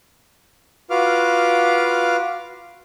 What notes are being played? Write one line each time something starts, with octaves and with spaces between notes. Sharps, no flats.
F4 F#4 B4 F5 D6 F6